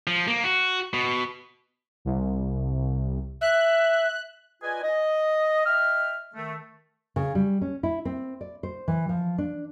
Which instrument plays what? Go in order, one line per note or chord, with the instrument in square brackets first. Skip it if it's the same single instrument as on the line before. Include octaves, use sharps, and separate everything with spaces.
[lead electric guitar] F3
A#3
F#4
B2
[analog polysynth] C2
[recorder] E5 [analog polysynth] F#6
[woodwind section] F4 B4 D5 D#5 G#5
D#5
D#5 E5 G5 F6
D#3 A3
[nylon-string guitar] C#3
G3
C#4
E4
C4
D5
C5
E3
F3
D4